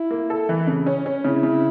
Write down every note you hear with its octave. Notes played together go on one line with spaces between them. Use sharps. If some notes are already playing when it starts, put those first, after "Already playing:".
Already playing: E4
A#3
A4
E3
C#3
C#4
C#4
C#3 E4
C#3